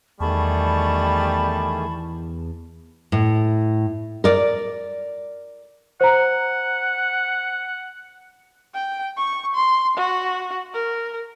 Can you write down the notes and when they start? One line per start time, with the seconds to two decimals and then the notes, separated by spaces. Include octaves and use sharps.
0.20 E2 D#3 G3 A3 G#4 A5 B5 C#6
3.12 A2
4.24 A#4 D5
6.01 C5 F#5 A#5
8.74 G5
9.17 C#6
9.55 C6
9.97 F#4
10.74 A#4